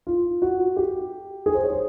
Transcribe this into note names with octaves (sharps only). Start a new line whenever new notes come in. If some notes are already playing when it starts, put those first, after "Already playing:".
F4
F#4
G4
G#4
C5
C#5
C5